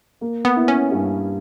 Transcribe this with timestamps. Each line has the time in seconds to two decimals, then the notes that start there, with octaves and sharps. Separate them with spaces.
0.21 A#3
0.45 B3
0.56 E4
0.68 C#4
0.91 G2